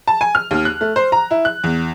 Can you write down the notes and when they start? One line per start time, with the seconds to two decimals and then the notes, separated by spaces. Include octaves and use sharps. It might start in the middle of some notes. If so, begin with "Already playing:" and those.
0.08 A5
0.21 G#5
0.35 F6
0.51 D#2
0.65 F#6
0.81 A3
0.96 C5
1.12 A#5
1.31 E4
1.45 F#6
1.64 E2